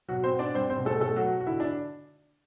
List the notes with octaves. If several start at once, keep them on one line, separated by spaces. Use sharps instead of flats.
B2 F#3 F#4
C4 C5
B3
D4 D5
G3 C4 C5
C4 C5
B2
A3 A4
B2 A3 A4
F#3 F#4
B3
F#4
D3 E4
D4